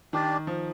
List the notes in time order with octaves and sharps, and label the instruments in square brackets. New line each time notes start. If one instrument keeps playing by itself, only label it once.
[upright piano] D#3 [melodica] D4 G4 D5
[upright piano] F3